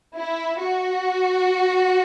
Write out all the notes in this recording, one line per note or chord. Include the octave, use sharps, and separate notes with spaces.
E4
F#4